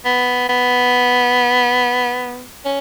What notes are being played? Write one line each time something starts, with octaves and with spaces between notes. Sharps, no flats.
B3
B3
C#4